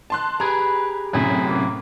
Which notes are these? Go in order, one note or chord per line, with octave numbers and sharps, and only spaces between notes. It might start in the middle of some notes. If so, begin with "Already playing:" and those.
A5 C6 F#6
G4 G#4 B4 A#5
F#2 A2 C3 F#3 E4 G#4
A#3